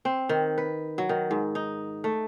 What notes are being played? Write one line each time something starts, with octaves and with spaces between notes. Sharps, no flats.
C4
D#3
B4
F#3
D#3
G#2
D#4
A3